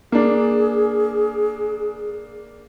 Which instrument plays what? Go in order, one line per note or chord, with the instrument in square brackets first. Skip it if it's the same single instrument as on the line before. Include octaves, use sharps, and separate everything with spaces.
[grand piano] A#3 D4 [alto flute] G#4